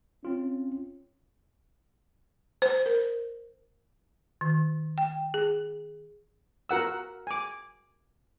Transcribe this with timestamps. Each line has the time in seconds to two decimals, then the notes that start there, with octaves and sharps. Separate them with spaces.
0.25 C4 C#4 F4
2.62 C5
2.86 A#4
4.41 D#3
4.98 G5
5.34 G#4
6.69 F#4 A#4 F#5 E6
7.27 G#5 D6